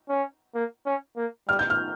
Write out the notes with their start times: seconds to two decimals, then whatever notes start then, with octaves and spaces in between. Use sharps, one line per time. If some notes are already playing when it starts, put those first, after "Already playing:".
0.09 C#4
0.55 A#3
0.86 C#4
1.17 A#3
1.49 G3 F6
1.59 G6
1.70 F6